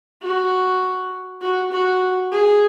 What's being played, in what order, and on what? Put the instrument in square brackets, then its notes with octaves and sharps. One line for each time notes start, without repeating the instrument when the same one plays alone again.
[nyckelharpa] F#4
F#4
F#4
G#4